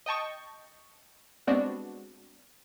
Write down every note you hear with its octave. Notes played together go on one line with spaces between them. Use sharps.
D#5 G5 A5 C#6
G3 G#3 B3 C4 D4 F#4